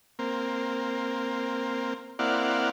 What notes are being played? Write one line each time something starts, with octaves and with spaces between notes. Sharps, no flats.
A#3 C4
A#3 C4 E4 D5 F5 F#5